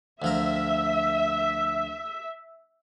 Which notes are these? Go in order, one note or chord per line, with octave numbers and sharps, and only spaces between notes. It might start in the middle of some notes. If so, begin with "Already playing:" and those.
D2 F3 A#4 E5